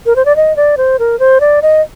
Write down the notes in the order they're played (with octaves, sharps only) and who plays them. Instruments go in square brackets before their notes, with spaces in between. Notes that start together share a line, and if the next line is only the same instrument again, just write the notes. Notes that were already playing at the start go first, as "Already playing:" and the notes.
[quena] A#4
C5
D5
D#5
D5
C5
A#4
C5
D5
D#5